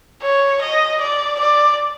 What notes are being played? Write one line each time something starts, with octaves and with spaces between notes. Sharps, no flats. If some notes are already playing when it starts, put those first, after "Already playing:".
C#5
D#5
D5
D5